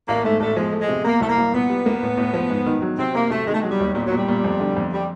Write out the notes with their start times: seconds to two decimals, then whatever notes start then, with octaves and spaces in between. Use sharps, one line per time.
0.08 A1 A#3
0.24 G#2 A3
0.40 A1 A3
0.56 F3 G#3
0.72 A3
0.81 G#3
0.88 C3
1.05 A#3 B3
1.21 C2 A3
1.29 A#3
1.38 C2
1.54 A#2 B3
1.69 G3
1.86 A#3
2.03 A2
2.17 A2
2.34 F3
2.50 G#2
2.66 D#3
2.82 F#3
2.99 C3 C4
3.15 C3 A#3
3.30 C3 A3
3.47 D#3 G#3
3.54 A3
3.62 F#3 G#3
3.71 G3
3.80 D#2
3.95 A#2 G3
4.07 A#2 F#3
4.17 G3
4.28 A#2
4.44 F2
4.60 D3
4.77 F2
4.92 G3